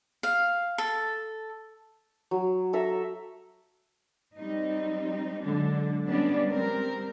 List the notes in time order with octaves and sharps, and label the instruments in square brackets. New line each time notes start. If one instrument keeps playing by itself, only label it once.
[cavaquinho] F5
A4
[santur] F#3
A4 E5 A#5
[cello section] G3 C4 D#4
D3 F#3 G#3 D4
G3 G#3 B3 C#4 D4 D5
G3 C4 A#4